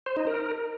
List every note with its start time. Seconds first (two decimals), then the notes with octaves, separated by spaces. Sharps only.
0.06 C5
0.17 D#4
0.27 A#4